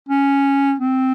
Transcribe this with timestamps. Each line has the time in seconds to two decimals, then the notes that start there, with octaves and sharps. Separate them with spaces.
0.09 C#4
0.80 C4